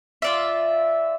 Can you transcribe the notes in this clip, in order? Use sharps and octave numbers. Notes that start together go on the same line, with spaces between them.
F4 D5 E5